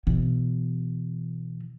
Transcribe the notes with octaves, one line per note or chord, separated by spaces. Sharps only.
B2 E3